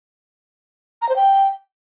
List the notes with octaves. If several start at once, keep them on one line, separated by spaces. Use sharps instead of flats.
A#5
C5
G5